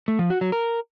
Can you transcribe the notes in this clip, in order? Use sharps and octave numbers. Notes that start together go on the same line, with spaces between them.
A3
F3
F#4
F#3
A#4